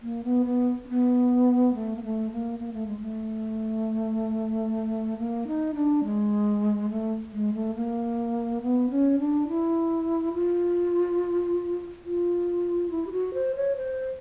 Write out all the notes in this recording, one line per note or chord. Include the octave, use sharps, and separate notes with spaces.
A#3
B3
B3
C4
B3
A3
A#3
A3
A#3
A#3
A3
G#3
A3
A#3
D#4
D4
G#3
A3
G#3
A3
A#3
B3
C#4
D4
E4
F4
F4
E4
G4
F#4
C5
C#5
C5